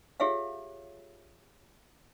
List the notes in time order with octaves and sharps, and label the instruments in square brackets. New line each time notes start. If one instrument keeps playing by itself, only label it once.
[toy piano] F4 G4 G#4 C#5 E5 F5